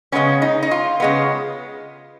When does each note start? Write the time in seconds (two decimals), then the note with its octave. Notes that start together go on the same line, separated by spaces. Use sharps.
0.12 C#3 G#3 B3 C#4
0.42 D#4
0.63 D#4
0.71 F4
1.00 C#3 G#3 B3